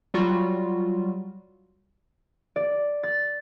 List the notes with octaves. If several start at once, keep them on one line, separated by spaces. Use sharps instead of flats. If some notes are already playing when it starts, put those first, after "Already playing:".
F#3 G3 F4 F#4
D5
A6